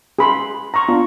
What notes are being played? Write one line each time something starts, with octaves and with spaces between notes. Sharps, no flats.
G#4 B5 C6
A#5 C6 C#6
B3 D4 F4